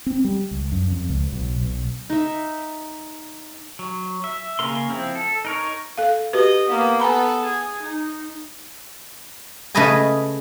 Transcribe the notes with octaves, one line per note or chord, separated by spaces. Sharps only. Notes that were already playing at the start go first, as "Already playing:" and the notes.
C4
G3
C#2
F#2
F2
C#2
B1
B1
D#4 E5
F#3
E5
C#3 A#3 A#4 C6
F3 C4 E4
A4
D#4 A#4 C#5
A4 F5
F#4 G4 B4 D#5
A#3 B3
B3 A4 G#5 A#5 B5
G#4
D#4
C#3 A3 C#4 B4 D#5 G#5